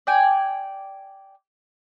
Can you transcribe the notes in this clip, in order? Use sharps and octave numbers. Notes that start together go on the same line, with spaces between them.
D5 G5 G#5